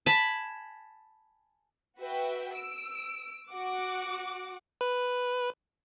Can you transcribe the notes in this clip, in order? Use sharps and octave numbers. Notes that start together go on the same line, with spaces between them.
G#5 A5 B5
F#4 B4 E5 G5
E6 D7
F#4 F#5 D6
B4